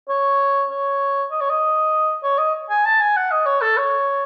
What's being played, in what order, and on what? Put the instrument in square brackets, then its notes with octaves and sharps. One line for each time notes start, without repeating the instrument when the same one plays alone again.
[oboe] C#5
C#5
D#5
C#5
D#5
C#5
D#5
G#5
A5
G#5
F#5
D#5
C#5
A4
C#5